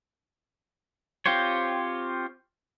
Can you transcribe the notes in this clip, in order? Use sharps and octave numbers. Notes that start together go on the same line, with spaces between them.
C4 F4 G4 C5 C#5